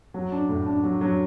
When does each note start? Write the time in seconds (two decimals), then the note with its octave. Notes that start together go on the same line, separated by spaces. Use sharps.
0.14 F#3
0.32 D4
0.49 A2
0.66 D4
0.83 F#3
1.01 F#3